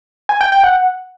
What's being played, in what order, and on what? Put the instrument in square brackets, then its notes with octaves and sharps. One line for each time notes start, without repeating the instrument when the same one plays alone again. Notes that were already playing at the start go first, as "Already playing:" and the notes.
[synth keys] G#5
G5
G5
F#5